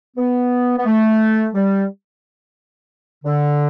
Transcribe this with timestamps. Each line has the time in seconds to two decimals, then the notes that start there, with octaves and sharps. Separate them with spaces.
0.17 B3
0.77 B3
0.86 A3
1.54 G3
3.24 D3